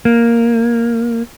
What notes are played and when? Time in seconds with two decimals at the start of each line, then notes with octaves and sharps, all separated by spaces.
0.05 A#3